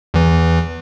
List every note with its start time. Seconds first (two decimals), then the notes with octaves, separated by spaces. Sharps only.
0.14 E2 E3